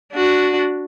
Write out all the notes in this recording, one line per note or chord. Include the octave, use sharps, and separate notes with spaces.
D4 F#4